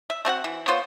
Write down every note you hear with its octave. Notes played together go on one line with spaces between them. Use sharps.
E5
A3 C4 F#4 F#5
E3
B3 F4 C5 C#5